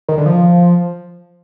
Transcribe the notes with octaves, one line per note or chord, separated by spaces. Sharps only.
D#3
D3
F3